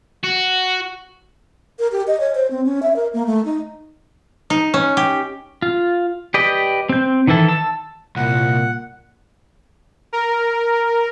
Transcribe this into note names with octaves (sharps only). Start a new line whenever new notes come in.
F#4
A#4
G4
D#5
C#5
C5
C4
C#4
E5
A#4
A#3
A3
D#4
D#4
C#4
G4
F4
G4 B4 D5 D#5
C4 G6
D#3 E3 E4 A4
A5 E6
C2 A#2 F#5
A#4